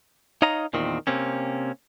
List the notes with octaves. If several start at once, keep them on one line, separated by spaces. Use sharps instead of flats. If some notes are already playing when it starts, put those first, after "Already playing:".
D#4 C#5 D#5 F5 A#5
E2 A#2 D#3 C4
C3 A#3 C4 C#4